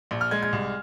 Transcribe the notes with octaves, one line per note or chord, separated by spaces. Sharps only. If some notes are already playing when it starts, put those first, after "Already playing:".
A#1
F6
G#3 G#6
G#6
C2